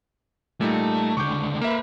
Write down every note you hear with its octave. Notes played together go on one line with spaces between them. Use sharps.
A#2 G3 A3 D#4
C#2 D3 C#6 D6 G6
A#3 A#4 B4 E5